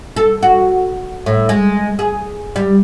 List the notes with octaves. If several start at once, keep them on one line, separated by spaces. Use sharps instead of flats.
A4
F#4
A2
G#3
G#4
G3